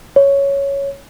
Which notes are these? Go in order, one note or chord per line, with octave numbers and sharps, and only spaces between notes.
C#5